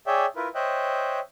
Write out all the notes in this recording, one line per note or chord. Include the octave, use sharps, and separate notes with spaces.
G#4 C#5 D5 E5 G5
E4 F4 A#4 B4
C5 C#5 D#5 E5 G5 F#6